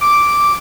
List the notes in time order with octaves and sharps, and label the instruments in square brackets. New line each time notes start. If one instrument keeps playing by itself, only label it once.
[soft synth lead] D6